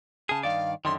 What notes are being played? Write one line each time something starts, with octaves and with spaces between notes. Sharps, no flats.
C#3 G#4 A5
G2 D#3 D5 F5
F#2 D3 D#3 C6